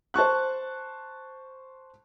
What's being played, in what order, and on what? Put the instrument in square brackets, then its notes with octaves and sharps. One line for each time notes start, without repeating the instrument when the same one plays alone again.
[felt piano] C5 A5 C#6 F#6